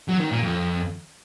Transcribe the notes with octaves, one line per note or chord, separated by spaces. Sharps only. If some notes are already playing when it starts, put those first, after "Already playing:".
F#3
D#3
A#2
F2